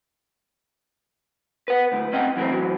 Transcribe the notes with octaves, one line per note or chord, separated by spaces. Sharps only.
B4 F#5
D2 A2
C4 C#4 D#5 F#5 G5
F#2 E3 G#3 A3 C4
A2 E3 F#3